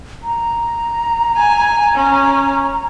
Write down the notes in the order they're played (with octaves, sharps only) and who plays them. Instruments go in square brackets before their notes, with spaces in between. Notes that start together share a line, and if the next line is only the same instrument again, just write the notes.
[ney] A#5
[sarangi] G#5
C#4